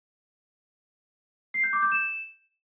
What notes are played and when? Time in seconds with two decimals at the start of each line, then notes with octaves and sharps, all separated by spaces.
1.54 C7
1.64 G6
1.73 D6
1.82 G6
1.92 E7